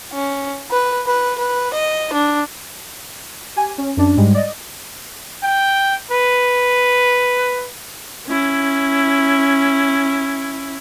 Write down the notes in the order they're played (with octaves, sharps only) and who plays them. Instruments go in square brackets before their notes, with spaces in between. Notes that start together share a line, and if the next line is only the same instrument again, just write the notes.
[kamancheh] C#4
B4
B4
B4
D#5
D4
[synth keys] G4 G#5
C#4
F#2 D4
G#2 G3 G#3
D5 D#5
[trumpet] G5
B4
[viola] C#4 E4